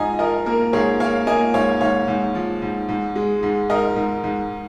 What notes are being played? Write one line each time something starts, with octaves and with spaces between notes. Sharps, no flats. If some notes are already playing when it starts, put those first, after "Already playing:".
Already playing: G#2 F3 D#5 G#5 A#5
F3 A#4 D#5
A#3 A#4
G#2 G#4 C#5
A#3 C#5 F5
A#3 D#5 G#5
G#2 C#5 F5
G#2 C#5 F5
G#2
F3
G#2
G#2
G#3
G#2
G#2 A#4 D#5
G#2
G#2